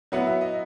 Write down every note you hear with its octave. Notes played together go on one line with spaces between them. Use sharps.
F#3 B3 E4 F#5
E5
D#5